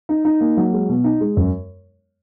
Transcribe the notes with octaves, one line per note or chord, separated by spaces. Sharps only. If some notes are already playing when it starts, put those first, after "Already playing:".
D#4
D#4
A#3
F#3
G#3
B2
D#4
G#3
F#2